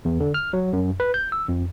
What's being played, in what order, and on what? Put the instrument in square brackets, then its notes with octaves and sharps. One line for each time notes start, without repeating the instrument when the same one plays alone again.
[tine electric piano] E2
D3
F6
F#3
F#2
B4
G6
E6
F2